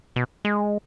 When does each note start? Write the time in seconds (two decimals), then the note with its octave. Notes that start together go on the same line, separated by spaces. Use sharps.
0.16 B2
0.45 G#3